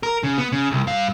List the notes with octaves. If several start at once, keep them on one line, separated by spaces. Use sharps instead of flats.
A#4
C#3
B3
C#3
C2
G2 F5